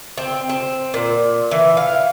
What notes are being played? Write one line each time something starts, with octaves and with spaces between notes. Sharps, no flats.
C4
C4
A#2
E3
F5